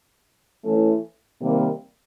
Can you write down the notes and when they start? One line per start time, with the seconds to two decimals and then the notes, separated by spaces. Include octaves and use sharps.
0.64 E3 A3 C#4 E4
1.40 C3 D#3 G3 A#3